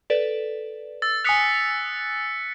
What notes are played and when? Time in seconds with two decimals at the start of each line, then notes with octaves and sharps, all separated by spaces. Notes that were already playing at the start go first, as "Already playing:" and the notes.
0.10 A4 B4 D5
1.02 E6 A6
1.25 G#5 D#6 F#6 B6 C#7 F7